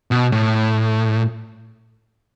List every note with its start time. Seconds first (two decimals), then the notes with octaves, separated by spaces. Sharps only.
0.11 B2
0.32 A2